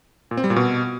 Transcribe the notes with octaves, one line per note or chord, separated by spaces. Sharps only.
A#2
C4
G3
A#2
B2